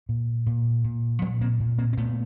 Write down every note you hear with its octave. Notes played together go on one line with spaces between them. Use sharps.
A#2
A#2
A#2
A#2 F3 G3
A#3 C4
A#2
A#3 C4
C4
A#2 A3 B3